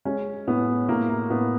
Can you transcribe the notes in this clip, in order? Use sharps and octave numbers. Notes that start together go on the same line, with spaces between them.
G#3 C#4
A2 B3
A2 A#3
A#3
A2 B3